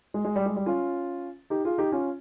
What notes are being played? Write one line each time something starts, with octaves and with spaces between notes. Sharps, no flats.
G#3
G#3
G3
G#3
G3
C#4 F4
D#4 G4
F4 G#4
D#4 G4
C#4 F4